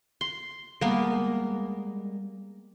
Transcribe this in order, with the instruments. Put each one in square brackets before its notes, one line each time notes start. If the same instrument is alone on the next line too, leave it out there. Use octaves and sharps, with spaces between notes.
[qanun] C6
[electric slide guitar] G3 G#3 A#4 [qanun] A#3 B3